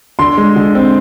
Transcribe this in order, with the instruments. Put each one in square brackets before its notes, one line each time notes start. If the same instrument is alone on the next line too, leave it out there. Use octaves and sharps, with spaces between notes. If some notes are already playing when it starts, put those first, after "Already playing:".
[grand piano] D3 C6
G#3
D3
C4